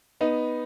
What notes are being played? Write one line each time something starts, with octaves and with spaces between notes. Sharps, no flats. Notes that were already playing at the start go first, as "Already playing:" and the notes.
B3 D#4